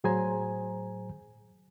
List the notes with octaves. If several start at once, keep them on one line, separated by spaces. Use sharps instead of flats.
A2 F#3 G#4 C5 G#5 A#5